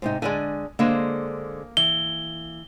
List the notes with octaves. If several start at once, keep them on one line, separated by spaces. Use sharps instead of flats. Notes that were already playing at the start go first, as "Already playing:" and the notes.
G#2 C3 D#4
D3 G#3 D5 G#5
D3 G#3 A#3 C5
E3 G7